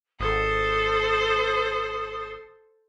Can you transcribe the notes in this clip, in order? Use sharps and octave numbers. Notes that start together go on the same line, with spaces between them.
G#1 A4 C5 D#6